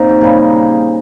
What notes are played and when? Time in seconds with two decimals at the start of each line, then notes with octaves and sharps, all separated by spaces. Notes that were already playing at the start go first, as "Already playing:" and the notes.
Already playing: A#2 C4 D#4
0.09 G4
0.21 C#3 G3 A#3 G#4